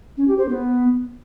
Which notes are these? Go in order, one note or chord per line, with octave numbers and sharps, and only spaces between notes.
C#4
G4
C5
B3